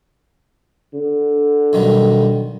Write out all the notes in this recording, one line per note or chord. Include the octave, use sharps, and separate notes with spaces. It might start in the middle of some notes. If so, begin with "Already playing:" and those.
D3
B1 D#3 G3